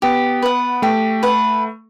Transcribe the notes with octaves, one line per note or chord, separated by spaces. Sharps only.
B3 G4
B4 F#5
A3 G4
B4 F#5